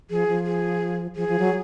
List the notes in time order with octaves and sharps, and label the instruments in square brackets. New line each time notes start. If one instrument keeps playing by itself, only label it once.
[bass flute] F3 [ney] G#4
[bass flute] F3
[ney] G#4
[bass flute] F3 [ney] G#4
[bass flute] F3
F#3